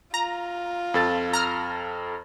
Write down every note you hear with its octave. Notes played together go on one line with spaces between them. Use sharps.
F4 A#5
F2 A4 A6
A#5 F6